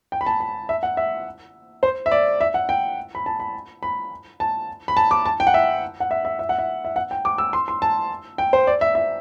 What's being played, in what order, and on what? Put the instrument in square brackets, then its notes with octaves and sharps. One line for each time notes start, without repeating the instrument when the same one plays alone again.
[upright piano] G5
B5
A5
B5
E5
F#5
E5
C5
E5
D5
E5
F#5
G5
B5
A5
B5
B5
A5
B5
A5
D6
A5
G5
F#5
E5
F#5
E5
E5
E5
F#5
E5
E5
F#5
G5
D6
E6
C6
C6
A5
G5
C5
D5
E5
E5